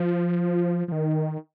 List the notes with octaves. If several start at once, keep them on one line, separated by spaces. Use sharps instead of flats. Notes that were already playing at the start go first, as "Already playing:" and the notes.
Already playing: F3
F3
D#3